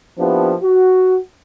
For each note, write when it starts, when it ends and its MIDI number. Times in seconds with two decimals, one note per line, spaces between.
0.19 0.53 53
0.19 0.53 58
0.19 0.53 59
0.19 0.53 62
0.19 0.53 64
0.19 0.53 67
0.62 1.18 66